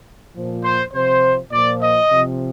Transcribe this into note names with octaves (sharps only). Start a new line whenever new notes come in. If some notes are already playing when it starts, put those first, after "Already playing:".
A#2 F3
C5
C3 F3 C5
A#2 F3 D5
D#5
C3 F3